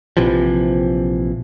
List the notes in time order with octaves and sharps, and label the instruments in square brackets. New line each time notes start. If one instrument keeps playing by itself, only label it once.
[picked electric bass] A#1 C3 E3 F3